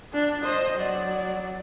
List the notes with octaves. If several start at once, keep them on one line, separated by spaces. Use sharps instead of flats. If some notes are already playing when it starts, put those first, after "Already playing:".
D4
C5 D#5
F#3 D5